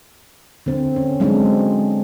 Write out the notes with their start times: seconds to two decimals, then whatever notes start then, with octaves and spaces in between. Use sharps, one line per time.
0.66 D3 C4
0.96 C#4
1.20 F#3 G#3 C4 D4